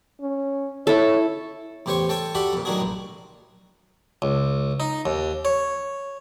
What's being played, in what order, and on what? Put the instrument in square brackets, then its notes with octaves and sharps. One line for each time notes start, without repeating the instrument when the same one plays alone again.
[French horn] C#4
[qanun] E4 A4 [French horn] C#5
[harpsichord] E2 A2 G4 C5 C#5 C#6
A4 C#5 G5 A5 C#6
F#4 G4 A4 D5 F#5 B5
F2 A#2
A2 D#3 F#3 D4 F#4 G#4
A#1
C#2
D#4
D#2
C#5